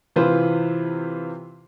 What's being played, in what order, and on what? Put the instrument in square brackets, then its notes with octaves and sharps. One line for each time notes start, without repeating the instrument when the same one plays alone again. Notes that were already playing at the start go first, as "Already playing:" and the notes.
[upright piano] C3 E3 F4 B4 C5